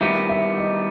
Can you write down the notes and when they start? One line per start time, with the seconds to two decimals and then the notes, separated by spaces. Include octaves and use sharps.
0.01 D#3 G3 B3 E4 E5
0.29 E5
0.58 D#5